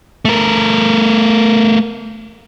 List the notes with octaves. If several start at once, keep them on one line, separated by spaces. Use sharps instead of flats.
A3 A#4